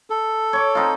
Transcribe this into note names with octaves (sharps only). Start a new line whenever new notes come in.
A4
C#5 C#6 D6
C4 D#4 F4